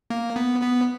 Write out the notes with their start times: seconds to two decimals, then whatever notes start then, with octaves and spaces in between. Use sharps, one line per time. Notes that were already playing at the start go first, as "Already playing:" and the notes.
0.10 A#3
0.36 B3
0.62 B3